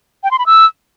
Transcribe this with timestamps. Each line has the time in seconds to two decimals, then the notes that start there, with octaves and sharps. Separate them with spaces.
0.24 G5
0.31 C6
0.39 B5
0.46 E6